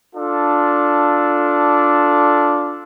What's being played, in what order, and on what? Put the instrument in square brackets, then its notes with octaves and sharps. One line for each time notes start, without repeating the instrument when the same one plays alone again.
[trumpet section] D4 F4 A4